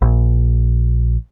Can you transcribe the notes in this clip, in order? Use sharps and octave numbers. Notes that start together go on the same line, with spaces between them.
A#1